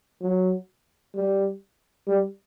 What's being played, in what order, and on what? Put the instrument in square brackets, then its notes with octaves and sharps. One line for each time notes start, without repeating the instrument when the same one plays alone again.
[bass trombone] F#3
G3
G3